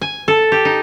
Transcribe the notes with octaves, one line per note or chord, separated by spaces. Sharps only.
G#5
A4
G4
D#4